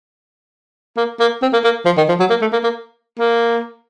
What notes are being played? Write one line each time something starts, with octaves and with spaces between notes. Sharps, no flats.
A#3
A#3
C4
A#3
A#3
F3
D#3
F3
F#3
A#3
A3
A#3
A#3
A#3